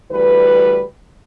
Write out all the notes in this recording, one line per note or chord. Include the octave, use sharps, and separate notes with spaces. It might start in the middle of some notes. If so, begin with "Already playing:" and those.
D2 E3 G3 B4